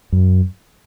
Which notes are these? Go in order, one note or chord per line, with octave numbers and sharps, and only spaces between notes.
F#2